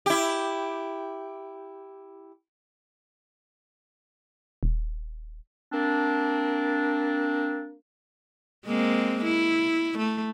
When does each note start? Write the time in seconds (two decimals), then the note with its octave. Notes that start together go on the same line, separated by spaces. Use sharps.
0.06 E4 G4
4.63 D#1
5.72 A#3 C4 D4
8.66 G#3 A#3 C4
9.24 E4
9.99 A3